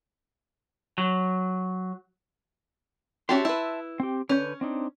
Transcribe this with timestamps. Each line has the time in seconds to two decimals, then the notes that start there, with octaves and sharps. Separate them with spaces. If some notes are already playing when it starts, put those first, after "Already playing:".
0.98 F#3
3.29 C#4 F#4 G4 E5 A5 C6
3.45 E4 B4
4.00 C4 G4
4.29 D3 C#4 B4 G6
4.61 C4 D4 D#4